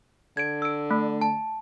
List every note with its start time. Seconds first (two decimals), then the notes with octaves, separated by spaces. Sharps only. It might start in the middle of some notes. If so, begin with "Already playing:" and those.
0.37 D3 G#6 D7
0.62 E6 D7
0.91 A3
1.21 A5